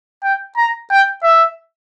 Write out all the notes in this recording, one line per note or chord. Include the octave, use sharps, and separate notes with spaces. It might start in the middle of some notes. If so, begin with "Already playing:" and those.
G5
A#5
G5
E5